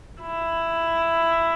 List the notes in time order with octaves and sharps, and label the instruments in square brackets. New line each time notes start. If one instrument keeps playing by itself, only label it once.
[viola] E4